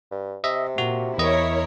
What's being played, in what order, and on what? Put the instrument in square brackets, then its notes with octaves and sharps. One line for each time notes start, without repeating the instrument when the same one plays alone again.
[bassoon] G2
[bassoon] C3 [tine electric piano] D#5 E5
[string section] A#2 [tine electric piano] F#4
[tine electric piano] E2 D#5 [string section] E4 A#4 C#5